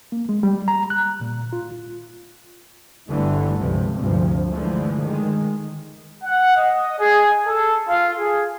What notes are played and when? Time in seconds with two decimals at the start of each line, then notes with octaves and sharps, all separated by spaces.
0.12 A#3
0.29 G#3
0.43 G3
0.68 A#5
0.90 F#6
1.21 A#2
1.53 F4
3.09 G1 D3 E3 G3 A3
3.58 C#2 G2 C3 F3
4.00 D2 G2 C3 F3
4.51 D3 E3 F3 G#3 A3
5.00 D#3 G#3
6.23 F#5
6.57 D#5
6.98 G#4
7.46 A4
7.88 F4
8.17 G#4